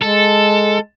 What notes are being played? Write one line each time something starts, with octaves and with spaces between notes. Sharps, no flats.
G#3 A4